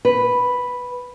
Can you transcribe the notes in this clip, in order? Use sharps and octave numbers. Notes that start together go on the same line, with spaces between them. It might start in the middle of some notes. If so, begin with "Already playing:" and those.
B4